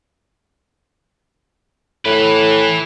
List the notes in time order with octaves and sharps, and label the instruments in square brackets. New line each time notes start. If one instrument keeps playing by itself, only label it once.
[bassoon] A2 [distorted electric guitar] E3 B4